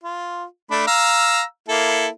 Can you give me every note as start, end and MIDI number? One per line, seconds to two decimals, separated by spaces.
0.04 0.44 65
0.71 0.82 57
0.71 0.82 62
0.71 0.82 83
0.87 1.42 77
0.87 1.42 82
0.87 1.42 88
1.69 2.08 58
1.69 2.08 64
1.69 2.08 69